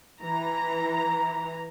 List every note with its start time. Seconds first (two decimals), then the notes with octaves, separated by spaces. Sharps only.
0.21 E3 A#5